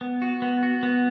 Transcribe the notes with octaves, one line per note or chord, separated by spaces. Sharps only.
B3
F#4
B3
F#4
B3